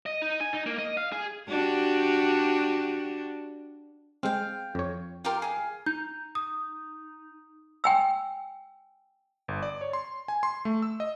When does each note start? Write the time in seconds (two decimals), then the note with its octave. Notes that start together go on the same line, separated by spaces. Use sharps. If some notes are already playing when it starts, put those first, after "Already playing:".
0.06 D#5
0.22 D#4
0.41 G#5
0.53 D#4
0.66 A#3
0.79 D#5
0.97 F5
1.12 G#4
1.48 D4 F#4 G4
4.23 G#3 C4 F5 G5
4.75 F2 C#5
5.25 F4 G4 A#4
5.42 G#4 F5
5.86 D#4 G6
6.35 D#6
7.84 G5 G#5 E6
9.48 G1
9.63 D5
9.81 C#5
9.93 C6
10.28 G#5
10.43 C6
10.65 A3
10.82 E6
11.00 D#5